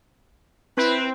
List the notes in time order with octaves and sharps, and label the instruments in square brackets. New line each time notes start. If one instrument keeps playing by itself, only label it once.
[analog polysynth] C4 [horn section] E4 B4